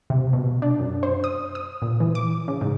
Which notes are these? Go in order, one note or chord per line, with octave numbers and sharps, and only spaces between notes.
C3
B2
D4
F#2
C5
D#6
D#6
A#2
E3
D6
C#3
G#2